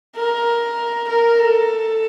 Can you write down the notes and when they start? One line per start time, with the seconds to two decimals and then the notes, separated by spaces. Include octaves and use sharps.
0.15 A#4
1.08 A#4
1.39 A4